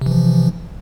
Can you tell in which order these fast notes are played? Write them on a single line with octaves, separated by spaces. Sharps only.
C3 E3 F3